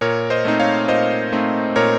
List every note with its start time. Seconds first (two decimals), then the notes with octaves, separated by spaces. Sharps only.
0.01 A#2 A#4 C#5
0.30 C5 D#5
0.45 A3 C4 D#4
0.60 C#5 F5
0.88 A#2 C5 D#5
1.32 A3 C4 D#4
1.76 A#2 A#4 C#5